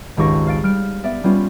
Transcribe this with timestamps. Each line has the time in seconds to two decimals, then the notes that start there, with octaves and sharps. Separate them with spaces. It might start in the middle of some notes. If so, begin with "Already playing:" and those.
0.17 G#1 C#2 G4 C#6 A#6
0.47 F5 A6 D7
0.63 G3 F6 D7
1.04 B3 D5 E5
1.24 G3 B3 C#4 F4